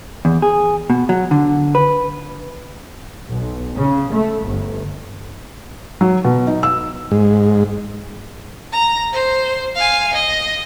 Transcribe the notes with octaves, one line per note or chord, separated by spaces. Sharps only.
E2
G#4
B2
F#3
D3
B4
B1
C#3
A3
G1
F#3
B2
D#4
E6
G#2
A#5
C5
F5 G#5
D#5